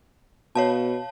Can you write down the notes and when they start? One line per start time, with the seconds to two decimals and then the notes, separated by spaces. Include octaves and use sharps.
0.55 B2 C#5 F5 A5